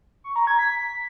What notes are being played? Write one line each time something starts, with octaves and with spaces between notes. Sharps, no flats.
C#6
A#5
G#6
B6